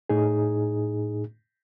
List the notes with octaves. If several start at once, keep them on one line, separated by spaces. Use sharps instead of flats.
A2 D#4 G#4